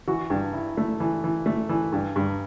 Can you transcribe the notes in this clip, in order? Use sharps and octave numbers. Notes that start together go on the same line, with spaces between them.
E3 F#4
G2
E4
A3
E3
E3
A3
E3
G2
G2